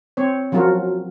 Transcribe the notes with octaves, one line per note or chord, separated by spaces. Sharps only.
C4 C#5
F3 F#3 C#4 F4 F#4 A#4